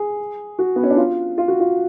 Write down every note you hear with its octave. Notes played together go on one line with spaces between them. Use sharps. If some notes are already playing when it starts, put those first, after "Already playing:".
Already playing: G#4
F#4
B3
C#4
D4
F4
F4
F#4
F4